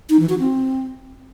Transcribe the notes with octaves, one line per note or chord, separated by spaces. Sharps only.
D#4
E3
F#4
C4